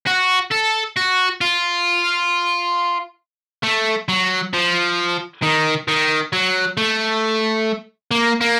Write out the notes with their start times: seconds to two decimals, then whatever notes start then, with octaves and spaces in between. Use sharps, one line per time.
0.07 F#4
0.51 A4
0.97 F#4
1.41 F4
3.64 A3
4.09 F#3
4.54 F3
5.42 D#3
5.88 D#3
6.33 F#3
6.77 A3
8.11 A#3
8.41 A#3